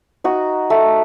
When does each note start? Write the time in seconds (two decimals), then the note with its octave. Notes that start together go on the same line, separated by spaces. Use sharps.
0.24 D#4 F#4
0.70 A3